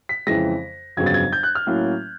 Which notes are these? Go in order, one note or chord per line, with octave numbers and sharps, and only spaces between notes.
B6
F2 C#3 E3 G#3 A#6
G1 F2 C#3 F#3 B3 G#6
A6
G#6
G6
F#6
F6
A2 F#3 A#3 C#4